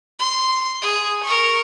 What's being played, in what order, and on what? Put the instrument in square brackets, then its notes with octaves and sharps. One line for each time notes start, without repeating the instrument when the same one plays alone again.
[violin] C6
G#4
A#4 C#6